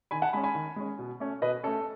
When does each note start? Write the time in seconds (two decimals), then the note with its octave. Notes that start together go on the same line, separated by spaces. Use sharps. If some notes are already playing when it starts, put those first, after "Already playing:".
0.11 D#3 G#5 B5
0.22 F#5 A5
0.33 G#3 C#4 G#5 B5
0.44 G#5 B5
0.55 D#3
0.76 G#3 C#4
0.99 B2
1.20 A3 C#4
1.42 B2 B4 D#5
1.63 A3 C#4 A4